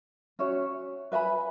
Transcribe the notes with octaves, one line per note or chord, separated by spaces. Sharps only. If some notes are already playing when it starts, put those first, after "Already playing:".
C#4 F#4 C#5 E5
B4 E5 G#5 B5